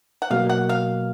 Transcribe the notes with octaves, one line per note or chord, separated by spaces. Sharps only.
F#5
B2 F#3 A#3 F5
F#5
F5